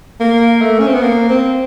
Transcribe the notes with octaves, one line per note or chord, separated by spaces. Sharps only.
A#3
A3
C#4
C4
B3
A#3
C4